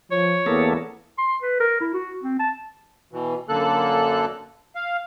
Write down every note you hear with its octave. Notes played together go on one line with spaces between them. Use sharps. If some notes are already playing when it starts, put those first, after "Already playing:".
F3 C#5
E2 A#3 B3 A4
C6
B4
A#4
E4
F#4
C4
A5
B2 E3
F#2 D3 A#3 A4 F#6
F5